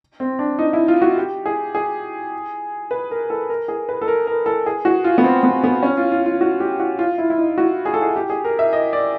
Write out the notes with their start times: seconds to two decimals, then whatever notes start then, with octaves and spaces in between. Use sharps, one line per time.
0.20 C4
0.39 D4
0.59 D#4
0.73 E4
0.88 F4
1.02 F#4
1.17 G4
1.46 G#4
1.75 G#4
2.91 B4
3.11 A#4
3.30 A4
3.50 A#4
3.68 G#4
3.89 B4
4.02 A4
4.08 A#4
4.27 A#4
4.46 A4
4.66 G#4
4.85 F#4
5.04 F4
5.18 B3
5.24 C4
5.43 B3
5.64 B3
5.83 C#4
5.97 F4
6.12 F4
6.26 F4
6.41 F#4
6.60 G4
6.80 F#4
6.99 F4
7.18 E4
7.30 E4
7.38 D#4
7.58 F#4
7.85 G#4
7.94 A4
8.02 G#4
8.16 G4
8.30 G#4
8.45 A#4
8.59 E5
8.73 D#5
8.93 D5